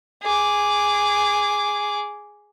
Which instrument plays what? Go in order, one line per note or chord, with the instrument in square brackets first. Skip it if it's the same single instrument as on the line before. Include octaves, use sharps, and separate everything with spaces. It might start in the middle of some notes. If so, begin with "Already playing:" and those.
[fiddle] G#4 D6